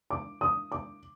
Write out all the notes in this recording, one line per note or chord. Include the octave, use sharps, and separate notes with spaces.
D6
D#6
D6